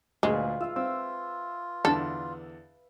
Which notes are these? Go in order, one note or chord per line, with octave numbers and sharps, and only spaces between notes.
D2 A#2 G#3 F4 G#4 B4
F4 E5 F5
C4 F4 E6
E2 D3 A4 A5